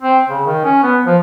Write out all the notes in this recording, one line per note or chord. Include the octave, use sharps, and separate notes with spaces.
C4
C#3
D#3
C#4
B3
F3